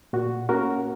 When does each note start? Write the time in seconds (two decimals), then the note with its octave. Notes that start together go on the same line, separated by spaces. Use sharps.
0.13 A#2 F#4
0.49 A#3 C#4 F#4 A#4